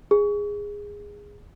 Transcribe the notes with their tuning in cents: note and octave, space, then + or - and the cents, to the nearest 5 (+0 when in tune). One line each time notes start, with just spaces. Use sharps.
G#4 -15